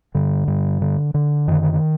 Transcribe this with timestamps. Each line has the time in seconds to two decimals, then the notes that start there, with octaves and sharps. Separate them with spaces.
0.15 G2 D3
0.48 G2
0.82 D3
1.14 D3
1.47 F#2 D#3